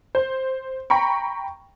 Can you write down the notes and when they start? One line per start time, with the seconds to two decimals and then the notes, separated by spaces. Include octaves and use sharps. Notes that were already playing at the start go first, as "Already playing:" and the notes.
0.15 C5
0.90 G5 A#5 B5 C#6